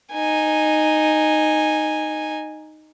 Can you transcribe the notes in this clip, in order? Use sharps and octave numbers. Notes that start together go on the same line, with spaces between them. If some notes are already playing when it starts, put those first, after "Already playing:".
D#4 G#5